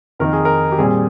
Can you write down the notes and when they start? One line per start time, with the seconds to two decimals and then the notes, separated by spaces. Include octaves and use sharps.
0.19 F2 D#3 A#3 D#4 A#4
0.33 G#4
0.45 A#4
0.72 G4
0.78 A#2 G3 C4 G#4